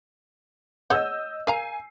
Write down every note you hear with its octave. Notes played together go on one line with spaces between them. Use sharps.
G#4 C#5 D#5 F#5 E6 G6
A#4 F5 G#5 A#5 C7